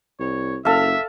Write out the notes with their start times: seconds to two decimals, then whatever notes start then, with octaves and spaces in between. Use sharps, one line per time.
0.20 C2 C#5
0.65 F#1 A4 E5 F5